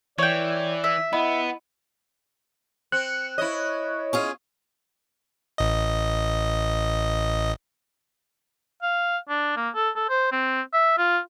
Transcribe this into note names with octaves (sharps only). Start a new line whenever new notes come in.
E3 C#5 D5 G5
E5
B3 E4 D#5 B5
C4 F#6 C#7
E4 C#5 D#5
C#4 F4 G#4
A1 D#5
F5
D4
A#3
A4
A4
C5
C4
E5
F4